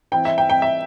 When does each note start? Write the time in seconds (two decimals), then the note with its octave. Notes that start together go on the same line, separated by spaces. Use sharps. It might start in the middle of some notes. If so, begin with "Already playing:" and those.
0.12 E3 C4 E4 G5
0.25 E5
0.38 G5
0.50 G5
0.62 E5